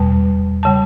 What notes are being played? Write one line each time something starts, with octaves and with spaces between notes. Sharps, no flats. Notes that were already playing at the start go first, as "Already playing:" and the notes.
Already playing: E2 B2 G3 A5
C#3 G3 A5